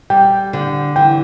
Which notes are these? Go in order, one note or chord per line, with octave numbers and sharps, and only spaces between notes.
G3 G5
D3
E3 G5